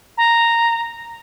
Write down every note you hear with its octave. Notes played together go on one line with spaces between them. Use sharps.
A#5